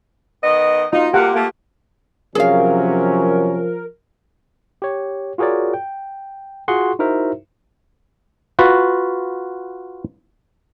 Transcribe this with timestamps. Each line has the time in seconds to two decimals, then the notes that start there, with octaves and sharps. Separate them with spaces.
0.44 D#3 B3 D#5
0.93 D#4 F4 F#4
1.14 C3 A3 A#3 G4 F#5
1.35 A3 A#3
2.35 C3 F3 F#3 C#4 G#4 A#4 F5
4.82 G4 C#5
5.38 F4 F#4 G#4 A#4 C#5 D5
5.74 G5
6.68 F4 F#4 G#4 F#5 C6 C#6
6.99 D#4 E4 F#4 A#4 C5 E5
8.59 F4 F#4 B4 F5